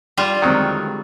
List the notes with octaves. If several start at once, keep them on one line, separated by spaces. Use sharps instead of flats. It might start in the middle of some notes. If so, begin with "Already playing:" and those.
G3 F4
D3 D#3 F#3 G#3 C4